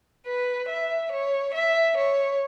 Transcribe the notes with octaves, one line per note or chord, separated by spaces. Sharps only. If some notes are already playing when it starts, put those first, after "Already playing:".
B4
E5
C#5
E5
C#5